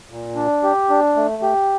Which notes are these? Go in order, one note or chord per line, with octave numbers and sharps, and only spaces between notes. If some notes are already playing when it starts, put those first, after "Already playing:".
A#2
D4
G4
D4
A3
G4